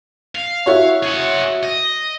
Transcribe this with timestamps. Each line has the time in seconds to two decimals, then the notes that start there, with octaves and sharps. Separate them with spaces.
0.35 F5
0.66 E4 F#4 C#5
1.04 G#4 F#5
1.63 D#5